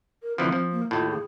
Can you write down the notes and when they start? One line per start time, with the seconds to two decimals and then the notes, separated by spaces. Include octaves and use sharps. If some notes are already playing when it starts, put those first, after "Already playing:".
0.22 A#4
0.38 D2 E3 F3 C4
0.52 F3
0.72 A#3
0.91 D#2 A2 F4
1.10 G#4